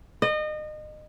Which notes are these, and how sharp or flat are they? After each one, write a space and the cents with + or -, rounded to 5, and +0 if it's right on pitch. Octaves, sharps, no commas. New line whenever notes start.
D#5 -30